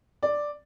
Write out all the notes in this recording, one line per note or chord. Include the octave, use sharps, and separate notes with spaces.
D5